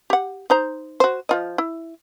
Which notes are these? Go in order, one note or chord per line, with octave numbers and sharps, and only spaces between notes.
G4 F#5
D#4 C5 A#5
F#4 C5
F3 F4 D#5
E4